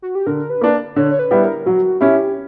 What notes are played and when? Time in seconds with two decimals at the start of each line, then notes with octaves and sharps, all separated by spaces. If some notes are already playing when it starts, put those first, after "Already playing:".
0.02 F#4
0.15 G4
0.27 D3 A#4
0.50 B4
0.61 A#3 D4
0.96 D3 C#5
1.11 C#5
1.19 B4
1.31 G3 B3 E4
1.42 A#4
1.66 F#3 F#4
2.00 C#4 E4 G4